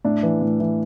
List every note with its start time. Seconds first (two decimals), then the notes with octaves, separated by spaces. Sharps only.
0.05 A2 D4
0.23 E3
0.41 A2
0.60 E3